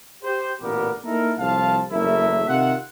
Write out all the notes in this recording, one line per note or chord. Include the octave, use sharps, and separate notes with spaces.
G4 C5
A1 A#2 D3 B3 G4 A#4
A#3 D#4 E4 A4 A#4
C2 A2 F3 F5 A5
F#1 E2 A3 E4 A#4 E5
C3 D#3 F4 E5 F#5